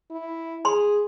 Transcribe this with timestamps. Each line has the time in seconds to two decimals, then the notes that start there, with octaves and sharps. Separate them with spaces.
0.11 E4
0.65 G#4 B5 C6